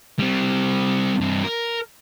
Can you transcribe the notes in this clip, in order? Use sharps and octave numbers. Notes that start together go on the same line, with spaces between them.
G3 C4
G2 C4
A#4